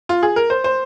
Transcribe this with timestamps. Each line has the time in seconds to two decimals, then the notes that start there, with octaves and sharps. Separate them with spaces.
0.09 F4
0.23 G#4
0.36 A#4
0.50 C5
0.64 C5